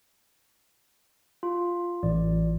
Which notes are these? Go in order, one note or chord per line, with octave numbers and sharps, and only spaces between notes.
F4
A1 D5